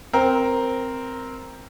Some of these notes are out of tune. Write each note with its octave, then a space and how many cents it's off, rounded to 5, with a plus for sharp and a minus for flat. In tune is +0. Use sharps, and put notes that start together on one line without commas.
C4 +0 A#4 +0